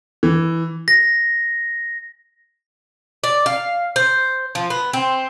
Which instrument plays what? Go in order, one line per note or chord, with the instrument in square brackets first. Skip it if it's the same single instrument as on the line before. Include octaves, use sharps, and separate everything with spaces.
[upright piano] E3
[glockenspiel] A#6
[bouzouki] D5
F5
C5
F3
B3
C4